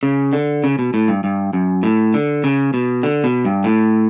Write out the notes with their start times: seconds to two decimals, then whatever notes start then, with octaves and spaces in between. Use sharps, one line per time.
0.03 C#3
0.33 D3
0.64 C#3
0.79 B2
0.94 A2
1.08 G2
1.24 G2
1.53 F#2
1.83 A2
2.14 D3
2.44 C#3
2.74 B2
3.03 D3
3.24 B2
3.45 G2
3.64 A2